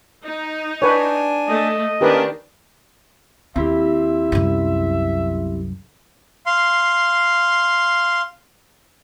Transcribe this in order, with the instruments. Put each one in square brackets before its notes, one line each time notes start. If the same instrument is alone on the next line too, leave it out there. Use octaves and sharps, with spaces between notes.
[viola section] D#4
[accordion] D4 G#5 [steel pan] B4 C#5
[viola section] A3 [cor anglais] D#5
[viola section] D#3 D4 [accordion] A#3 C#4 A#4 [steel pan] G4 B4
[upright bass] D#2 [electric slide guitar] C4 E4 G4 [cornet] E5
[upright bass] C2 F#2
[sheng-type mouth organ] F5 C6